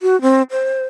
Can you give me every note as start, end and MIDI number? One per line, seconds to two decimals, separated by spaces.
0.02 0.20 66
0.22 0.42 60
0.51 0.85 72